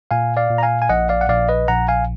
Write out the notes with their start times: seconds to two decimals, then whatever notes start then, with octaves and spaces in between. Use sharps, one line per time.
0.11 A#2 F5 G#5
0.37 D5 F5
0.50 A#2
0.58 A#5
0.63 F5 G#5
0.82 G#5
0.90 A#1 D#5 F#5
1.09 D5 F5
1.21 F#5
1.29 A#1 D5 F5
1.49 B4 D#5
1.68 A#1 F#5 A#5
1.88 F5 G#5